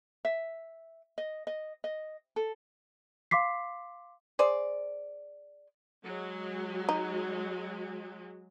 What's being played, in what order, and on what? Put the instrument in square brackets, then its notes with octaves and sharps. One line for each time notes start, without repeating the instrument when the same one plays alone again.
[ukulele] E5
D#5
D#5
D#5
A4
[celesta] F5 C6 D6 B6 C7
[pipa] G#4 C5 D5
[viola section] F#3 G#3
[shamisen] D#4